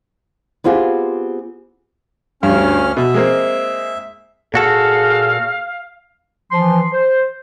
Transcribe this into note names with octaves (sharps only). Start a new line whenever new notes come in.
B3 C4 F4 G4 G#4
D2 G2 C#4 F6
B2 E5
G#3 A#3 C4
A#2 F#4 G#4 A4 F5
E3 F3 C6
C5